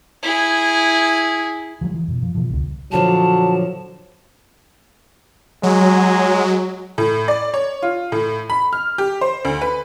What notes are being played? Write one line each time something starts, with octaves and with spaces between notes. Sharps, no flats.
E4 G#4
F3 F#3 G#3
E3
F#2 B2
F3
B2 E3 F3
C#2 G2 B2
A#2 D3 F3 F#3 A5
F#3 G#3
A2
D5
C#5
F4
A2
B5
F6
G4
C5
D2
B4